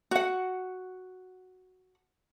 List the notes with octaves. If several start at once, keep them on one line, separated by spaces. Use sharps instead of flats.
F#4 F#5